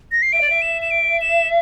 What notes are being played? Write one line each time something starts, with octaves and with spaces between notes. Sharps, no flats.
A#6
C7
E5 D7
D5
E5
E7
E7
D7
E7